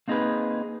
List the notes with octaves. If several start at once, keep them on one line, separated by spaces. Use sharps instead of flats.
A#3 C4 D#4 G4 G#4 B4